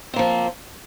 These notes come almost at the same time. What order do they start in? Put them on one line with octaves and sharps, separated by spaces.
C4 A#3 F3